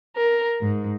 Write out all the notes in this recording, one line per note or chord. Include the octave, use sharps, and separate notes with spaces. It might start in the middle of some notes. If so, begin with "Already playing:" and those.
A#4
G#2